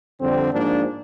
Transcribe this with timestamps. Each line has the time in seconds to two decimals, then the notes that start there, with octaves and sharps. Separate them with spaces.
0.20 F2 D3 G3 C4
0.52 G#2 F3 A#3 D4